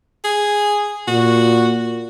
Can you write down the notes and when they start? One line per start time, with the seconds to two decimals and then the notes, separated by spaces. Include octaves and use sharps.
0.24 G#4
1.08 A#2 F#4